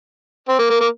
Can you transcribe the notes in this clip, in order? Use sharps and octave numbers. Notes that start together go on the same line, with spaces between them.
C4
A#3
A#3
A#3